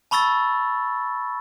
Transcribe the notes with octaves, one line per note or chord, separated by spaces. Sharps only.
A5 B5 C#6 E6 A6